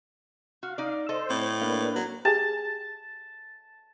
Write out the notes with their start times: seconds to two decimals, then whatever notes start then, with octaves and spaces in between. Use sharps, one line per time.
0.63 F#4 F5
0.78 D#4 D5
1.09 A4 C5 D#5
1.30 A2 C4
1.61 A#3 D4 B4 F5
1.96 F#3
2.25 G4 G#4 A5